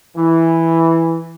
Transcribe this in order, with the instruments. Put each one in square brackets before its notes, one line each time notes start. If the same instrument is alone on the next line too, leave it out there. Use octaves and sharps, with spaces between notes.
[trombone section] E3